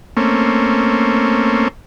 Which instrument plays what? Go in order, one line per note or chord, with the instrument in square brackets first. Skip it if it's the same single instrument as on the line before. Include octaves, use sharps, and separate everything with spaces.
[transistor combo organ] A3 A#3 C4 C#4